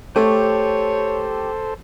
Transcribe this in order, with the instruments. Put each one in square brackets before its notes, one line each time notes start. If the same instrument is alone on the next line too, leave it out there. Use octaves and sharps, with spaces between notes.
[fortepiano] A3 [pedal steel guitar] G4 C#6 [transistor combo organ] A4 C5 [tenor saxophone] C#5